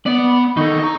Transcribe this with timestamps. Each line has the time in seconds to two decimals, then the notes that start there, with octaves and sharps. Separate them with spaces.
0.06 B3 D5
0.26 B5
0.57 D#3 D#4 A4 C#6
0.80 D#5 A#5